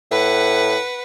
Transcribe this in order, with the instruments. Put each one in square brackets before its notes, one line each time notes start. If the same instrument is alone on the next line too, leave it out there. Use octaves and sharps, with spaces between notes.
[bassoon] A2 [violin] B4 F#5